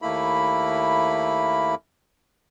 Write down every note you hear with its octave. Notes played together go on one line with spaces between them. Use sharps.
D#2 A3 A#3 E4 B5